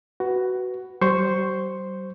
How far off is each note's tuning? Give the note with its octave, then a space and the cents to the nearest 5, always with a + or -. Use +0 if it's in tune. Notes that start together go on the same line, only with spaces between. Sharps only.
F#4 +10 B4 +0
G3 -45 C5 +0 C#6 +0